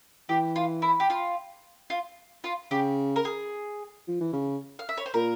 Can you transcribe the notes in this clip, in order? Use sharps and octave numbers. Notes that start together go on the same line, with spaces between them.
E3 G4
F4
E4
G4
F4
F4
F4
C#3 G4
A#4
G#4
F3
E3
C#3
F5
E5
C#5
C5
A#2 A#4